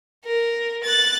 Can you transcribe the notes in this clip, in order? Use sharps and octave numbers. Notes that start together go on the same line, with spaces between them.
A#4
F#6 A6